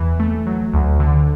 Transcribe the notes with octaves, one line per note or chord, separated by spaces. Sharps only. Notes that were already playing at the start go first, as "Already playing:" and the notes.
Already playing: E2 E3
A3
F#3
D2
D3